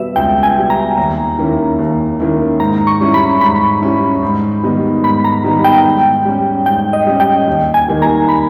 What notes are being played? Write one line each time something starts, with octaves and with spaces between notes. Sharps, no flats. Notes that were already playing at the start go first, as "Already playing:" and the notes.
Already playing: B2 G3 B4 E5
C#2 G5
G#5
B2 G3
A#5
D#2
D#3 A#3 C#4 E4
D#2
D#3 A#3 C#4 E4
G#2 A#5
C#6
G3 C#4 E4
B5
G#2 B5
G3 C#4 E4
G#2
D#3 G3 B3 D#4
G#2 B5
A#5
D#3 G3 B3 D#4
G5
G#2
G3 C#4
G#2 G5
D#5
G3 C#4
G5
D#2
G#5
D#3 G3 A#3 D#4
A#5
B5